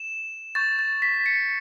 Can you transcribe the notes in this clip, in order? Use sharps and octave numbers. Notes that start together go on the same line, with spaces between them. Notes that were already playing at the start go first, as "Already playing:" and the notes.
Already playing: E7
C#6 G6 A6
A6
B6
C#7